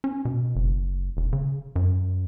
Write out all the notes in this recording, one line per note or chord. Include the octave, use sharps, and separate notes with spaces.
C#4
B2
F#1
E1
C#3
F#2